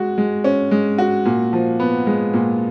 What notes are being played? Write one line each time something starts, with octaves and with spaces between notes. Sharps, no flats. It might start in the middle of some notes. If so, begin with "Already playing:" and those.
Already playing: G#3 F#4
G#3
C#4
G#3
F#4
A#2
F3
B3
G#3
A#2